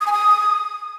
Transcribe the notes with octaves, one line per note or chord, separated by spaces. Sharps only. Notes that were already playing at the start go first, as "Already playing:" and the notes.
D#6
G#5
D#6